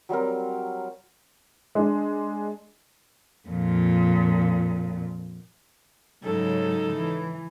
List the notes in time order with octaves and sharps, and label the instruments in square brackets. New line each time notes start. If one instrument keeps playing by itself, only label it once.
[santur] F#3 G3 C4 A#4
[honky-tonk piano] G#3 D4
[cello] F2 A#2
[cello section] G#2 C#3 F#3 [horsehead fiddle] D#4 A4
[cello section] E3